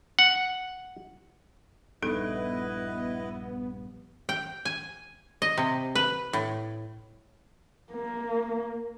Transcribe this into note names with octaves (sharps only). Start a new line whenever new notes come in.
F#5
A#1 G2 B3 D#4 E4 A4 B4 D#5
G5
G#5
D#5
C3
B4
A2
A#3